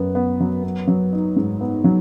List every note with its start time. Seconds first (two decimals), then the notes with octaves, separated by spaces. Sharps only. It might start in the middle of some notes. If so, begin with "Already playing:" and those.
Already playing: F#2 B3
0.15 B3
0.40 F#3
0.64 B3
0.88 F#3
1.13 D#4
1.36 G#2
1.61 B3
1.84 F#3